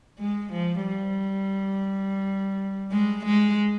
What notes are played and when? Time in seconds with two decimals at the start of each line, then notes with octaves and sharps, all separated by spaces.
0.19 G#3
0.52 F3
0.87 G3
2.91 G#3
3.25 G#3